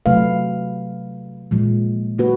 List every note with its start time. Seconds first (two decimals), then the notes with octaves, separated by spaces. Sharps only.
0.06 C3 F#3 A3 B4 F5
1.51 A#2 F3 G#3
2.18 A#3 F#4 B4